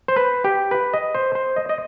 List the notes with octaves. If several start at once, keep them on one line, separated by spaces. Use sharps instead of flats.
C5
B4
G4
B4
D#5
C5
C5
D#5
D#5